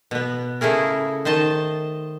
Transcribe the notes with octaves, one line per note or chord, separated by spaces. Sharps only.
B2 B3
C#3 A3 E4 G#4 A#4
D#3 C5 D#5 A5